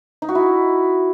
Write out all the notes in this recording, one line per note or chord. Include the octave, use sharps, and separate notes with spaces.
D#4
F#4
E4